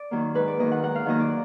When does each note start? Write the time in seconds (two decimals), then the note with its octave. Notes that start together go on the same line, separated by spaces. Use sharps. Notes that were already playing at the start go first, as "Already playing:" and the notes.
Already playing: D5
0.11 D#3 F#3 A#3
0.35 G#2 B4
0.48 D5
0.59 D#3 F#3 A#3 D#5
0.71 F#5
0.83 G#2 F#5
0.95 F5
1.06 D#3 F#3 A#3 D#5
1.20 D5